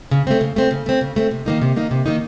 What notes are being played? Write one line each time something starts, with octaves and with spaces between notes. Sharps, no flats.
C#3
A3 C4
C#3
A3 C4
C#3
A3 C4
C#3
A3 C4
C3
D#3 A#3 D#4
C3
D#3 A#3 D#4
C3
D#3 A#3 D#4